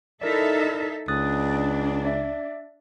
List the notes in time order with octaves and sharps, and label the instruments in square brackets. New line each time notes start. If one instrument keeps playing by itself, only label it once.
[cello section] D#4 A4 E5 [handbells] E4 A#4 D5
[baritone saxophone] C#2 [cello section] D4 [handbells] D#6 F#6 A6
[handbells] D5 E5